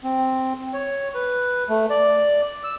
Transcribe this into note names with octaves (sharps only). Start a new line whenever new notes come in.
C4
C#5
B4
A3
D5
E6